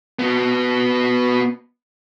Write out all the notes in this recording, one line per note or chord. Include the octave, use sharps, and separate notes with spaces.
B3 F#4